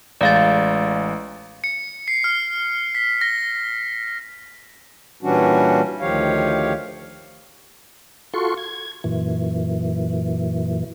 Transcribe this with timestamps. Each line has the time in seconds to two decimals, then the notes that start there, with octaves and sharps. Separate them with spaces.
0.21 A1 G#3 D5 F5 A6
1.64 C#7
2.08 C7
2.24 F6
2.95 B6
3.21 A#6
5.23 A#2 E3 G3 C#4 D4 F#4
6.00 D2 D#3 F3 G4 C#5 F5
8.34 F4 F#4 A4 C6 C#6
8.58 G#6
9.04 F#2 A#2 E3